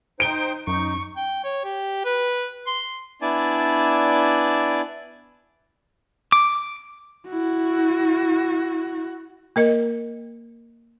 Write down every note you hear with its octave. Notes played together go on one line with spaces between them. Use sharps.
D#4 C5 G5 D7 G7
F#2 D#4 C#6
G5
C#5
G4
B4
C6
B3 D4 E4 D5 G#5 A5
D6
E4 F#4
A#3 A#4 D#5